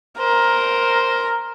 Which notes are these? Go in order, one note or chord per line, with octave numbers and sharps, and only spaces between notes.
A#4 C5